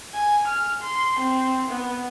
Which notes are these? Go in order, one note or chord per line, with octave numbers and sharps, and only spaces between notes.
G#5
F6
C6
C4
B3